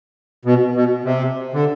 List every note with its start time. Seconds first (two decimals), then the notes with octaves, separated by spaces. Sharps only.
0.45 B2
0.75 B2
1.04 C3
1.53 D3